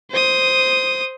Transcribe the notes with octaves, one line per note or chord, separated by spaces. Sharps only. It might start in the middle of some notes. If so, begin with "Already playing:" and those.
C5 D#6